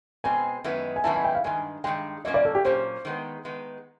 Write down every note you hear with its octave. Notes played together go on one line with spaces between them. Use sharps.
B2 G#3 C4 G#5
F#2 D#3 G#3 B3 E4
G#5
F#2 D#3 G#3 B3 E4 A5
G#5
G5
F5
G2 D#3 G#3 G#5
G2 D#3 G#3 G5
A#2 F#3 A#3 C#4 D#5
D5
A4
G4
A#2 F#3 A#3 C#4 C5
D#3 G#3 B3
D#3 G#3 B3